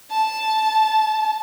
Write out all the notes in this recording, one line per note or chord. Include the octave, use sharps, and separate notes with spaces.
A5